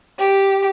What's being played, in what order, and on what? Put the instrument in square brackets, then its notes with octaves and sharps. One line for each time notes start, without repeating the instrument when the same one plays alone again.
[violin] G4